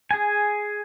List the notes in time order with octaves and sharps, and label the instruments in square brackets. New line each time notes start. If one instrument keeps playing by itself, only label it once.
[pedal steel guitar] G#4 G#5